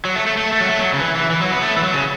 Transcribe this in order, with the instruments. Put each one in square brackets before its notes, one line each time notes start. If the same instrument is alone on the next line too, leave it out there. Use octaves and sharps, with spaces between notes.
[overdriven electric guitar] F#3
A3
A3
A3
A3
F#3
A3
F#3
C#3
E3
E3
E3
F#3
B3
A3
E3
F#3
C#3